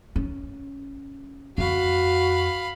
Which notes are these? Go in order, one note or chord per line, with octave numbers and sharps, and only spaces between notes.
C#4
F2 F#4 F5 B5